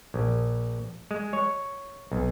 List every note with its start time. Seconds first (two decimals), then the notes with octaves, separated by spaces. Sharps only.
0.14 A#1
1.11 G#3
1.33 C#5
2.12 B1